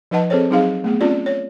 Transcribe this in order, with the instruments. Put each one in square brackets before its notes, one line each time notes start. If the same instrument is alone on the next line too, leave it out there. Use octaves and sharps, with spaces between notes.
[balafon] F3 D#4 B4 D#5 F#5 A5
C4 G#4 A4 C5 C#5
F#3 C4 D#4 G#4 F5
A3 B3 G#4
C4 C#4 F4 G4 D5
C#5